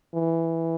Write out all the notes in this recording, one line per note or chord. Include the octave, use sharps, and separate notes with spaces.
E3